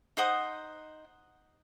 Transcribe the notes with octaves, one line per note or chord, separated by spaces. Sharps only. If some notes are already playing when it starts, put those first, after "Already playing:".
D#4 C5 F#5 D#6